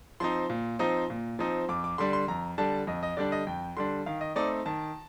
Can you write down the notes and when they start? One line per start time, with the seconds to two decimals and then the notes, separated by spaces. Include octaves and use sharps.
0.20 F3 C4 D#4 C6
0.50 A#2
0.79 F3 C4 D#4
1.10 A#2
1.39 F3 C4 D#4
1.69 F2 D6
1.84 D6
1.98 D3 G3 D4 C6
2.13 C6
2.28 F2 A#5
2.58 D3 G3 D4 A5
2.87 F2 D#5
3.03 D#5
3.17 D3 G3 D4 D5
3.32 D#5
3.47 F2 G5
3.77 D3 G3 D4 C6
4.06 D#3 F5
4.21 D#5
4.36 A3 C4 D#4 D5
4.66 D#3 A5